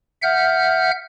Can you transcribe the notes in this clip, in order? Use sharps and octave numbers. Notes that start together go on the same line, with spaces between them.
E5 F#5 F6 G6